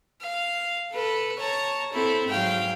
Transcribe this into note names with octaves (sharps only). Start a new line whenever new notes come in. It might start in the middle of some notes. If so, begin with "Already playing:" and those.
F5
A4 B4
C#5 A5 A#5
C4 E4 A4
G#2 F#3 F5 G5